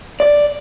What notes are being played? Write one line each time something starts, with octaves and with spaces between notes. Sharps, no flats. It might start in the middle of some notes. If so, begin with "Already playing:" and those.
D5